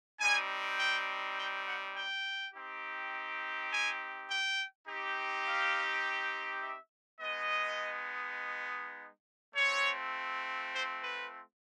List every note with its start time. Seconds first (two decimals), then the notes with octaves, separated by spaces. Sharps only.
0.19 G3 C4 D#4 G#5
0.77 G5
1.36 G5
1.65 F#5
1.94 G5
2.53 C4 D#4 G4
3.70 G#5
4.28 G5
4.87 C4 D#4 G4
5.46 F5
6.62 E5
7.21 G#3 B3 D#4 D#5
9.55 A3 C4 F4 C#5
10.73 C5
11.01 B4